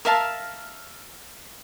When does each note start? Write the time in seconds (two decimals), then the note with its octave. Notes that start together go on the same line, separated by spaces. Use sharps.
0.05 A#4 E5 F5 A5